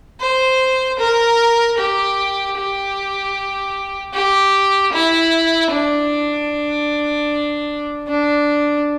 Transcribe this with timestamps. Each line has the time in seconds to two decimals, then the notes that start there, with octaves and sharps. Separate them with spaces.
0.20 C5
0.99 A#4
1.78 G4
2.57 G4
4.14 G4
4.92 E4
5.71 D4
8.08 D4